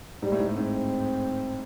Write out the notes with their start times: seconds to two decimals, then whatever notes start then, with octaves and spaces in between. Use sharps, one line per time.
0.22 G#2 G3
0.32 A2
0.40 G#2
0.49 A2
0.56 G#2 C4